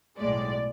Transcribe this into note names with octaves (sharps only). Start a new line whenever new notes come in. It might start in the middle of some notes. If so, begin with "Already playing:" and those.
B1 A2 G#3 D5